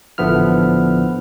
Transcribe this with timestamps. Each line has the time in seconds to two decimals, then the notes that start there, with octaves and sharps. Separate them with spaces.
0.18 A1 D3 F3 B3 E4 F6